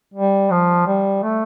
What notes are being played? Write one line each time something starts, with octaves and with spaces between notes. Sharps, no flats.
G3
F3
G3
A3